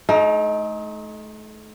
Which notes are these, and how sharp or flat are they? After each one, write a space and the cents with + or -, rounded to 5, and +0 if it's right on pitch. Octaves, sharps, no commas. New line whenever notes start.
A3 -35 D#4 +15